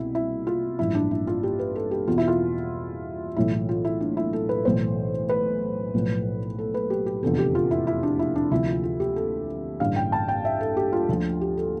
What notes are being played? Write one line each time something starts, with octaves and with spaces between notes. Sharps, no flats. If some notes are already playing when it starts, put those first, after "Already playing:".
Already playing: C2 B2 E4
E4
F4
A1 G2 F3 E4
D4
E4
F4
G4
B4
A4
G4
E2 B2 F4
E4
F4
B1 A2 E3 E4
E4
F4
E4
D4
E4
A4
B4
B1 A2 E3 C5
B4
B1 A2 F3
A4
B4
G4
G4
F1 E2 D3 F3 A4
G4
F4
E4
E4
D4
E4
D4
D2 C3 F3 E4
F4
F4
G4
A4
A1 G2 D3 F5
G5
A5
G5
E5
A4
G4
F4
D2 D3 F3 F4
G4
A4